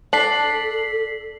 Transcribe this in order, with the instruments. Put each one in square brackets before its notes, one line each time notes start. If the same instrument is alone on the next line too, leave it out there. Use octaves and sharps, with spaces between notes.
[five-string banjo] D4 [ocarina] A4 [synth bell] B6 C7 F#7